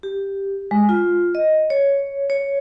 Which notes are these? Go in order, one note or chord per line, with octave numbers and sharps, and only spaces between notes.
G4
G#3
F4
D#5
C#5
C#5